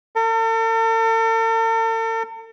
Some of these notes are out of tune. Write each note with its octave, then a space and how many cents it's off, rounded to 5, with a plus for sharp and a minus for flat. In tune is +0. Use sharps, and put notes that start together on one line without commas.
A4 +45